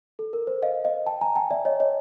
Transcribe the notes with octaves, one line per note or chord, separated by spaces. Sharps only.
A4
A#4
C5
D#5 F5
D#5 F5
G5 A5
G#5 A#5
G5 A5
D5 E5
C#5 D#5
C#5 D#5